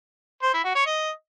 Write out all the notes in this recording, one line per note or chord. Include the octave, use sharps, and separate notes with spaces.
C5
E4
F#4
C#5
D#5